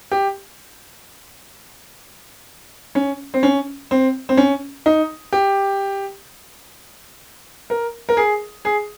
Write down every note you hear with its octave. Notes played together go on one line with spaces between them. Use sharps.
G4
C#4
C4
C#4
C4
C4
C#4
D#4
G4
A#4
A#4
G#4
G#4